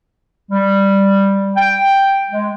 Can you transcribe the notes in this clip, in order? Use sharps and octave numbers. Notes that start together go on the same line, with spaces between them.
G3
G5
G#3